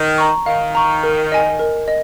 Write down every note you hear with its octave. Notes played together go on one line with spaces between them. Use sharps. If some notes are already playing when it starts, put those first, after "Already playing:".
Already playing: D#3
A#5 C#6
D#3 F5
A#5 C#6
A#4
D#5 G#5
A#4
D#5